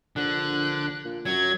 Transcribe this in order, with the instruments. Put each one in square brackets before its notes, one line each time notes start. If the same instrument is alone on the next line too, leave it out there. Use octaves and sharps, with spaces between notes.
[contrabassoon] A#1 [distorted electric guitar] D3 [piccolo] F#6
[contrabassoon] A#2
[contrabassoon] F#2 [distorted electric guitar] F#3 [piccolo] G#6